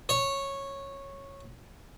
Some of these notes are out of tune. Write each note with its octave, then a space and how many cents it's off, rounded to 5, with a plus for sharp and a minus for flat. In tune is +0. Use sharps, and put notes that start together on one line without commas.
C#5 -10